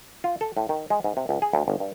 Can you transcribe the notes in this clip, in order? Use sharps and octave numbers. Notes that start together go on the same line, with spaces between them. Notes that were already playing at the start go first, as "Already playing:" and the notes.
F4
A4
A2
D#3
G#3
G#2
C3
C#2
G#4
D2
G1
G2